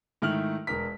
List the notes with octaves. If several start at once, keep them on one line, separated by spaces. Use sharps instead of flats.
G#2 D#3 A3 E4 F6 F#7
E1 A#4 B6